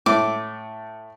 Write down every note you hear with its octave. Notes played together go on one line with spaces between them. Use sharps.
A2 A3 D6